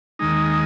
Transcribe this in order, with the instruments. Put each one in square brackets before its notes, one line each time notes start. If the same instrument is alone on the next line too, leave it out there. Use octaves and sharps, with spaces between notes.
[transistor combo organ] D#2 D#3 G#3 D#4